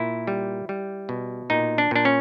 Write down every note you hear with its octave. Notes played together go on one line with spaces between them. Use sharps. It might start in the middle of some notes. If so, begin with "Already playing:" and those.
Already playing: A#2 E4
G3
G3
B2
A#2 D#4
D4
A#2 D4
C#4